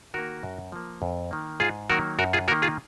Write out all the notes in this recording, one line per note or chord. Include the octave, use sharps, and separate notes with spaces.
D#3 A#3 F#4 A#4
F#2
F3 A#3
F2
D#3 A#3
G#2 F4 G#4
D#3 F#3 A#3 F#4 A#4
F#2 F#4 A#4
F4 G#4
D#3 A#3 F#4 A#4
F4 G#4